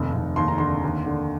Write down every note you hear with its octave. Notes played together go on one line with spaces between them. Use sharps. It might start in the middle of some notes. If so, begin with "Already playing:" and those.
Already playing: F1 D#2
F1
D#2 C6
A#5
D3 C6
D#2
D3